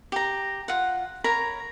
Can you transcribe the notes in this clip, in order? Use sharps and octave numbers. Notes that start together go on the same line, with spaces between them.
G4 A#5
F4 F#5
A#4 C#5 A#5 B5